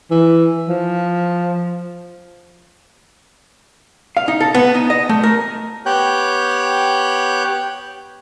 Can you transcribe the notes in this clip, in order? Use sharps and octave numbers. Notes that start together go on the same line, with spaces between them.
E3
F3
F5
D#4
A4
B3
D#4
D#5
A3
A#4
B3 G4 C#5 G5 F#6 G6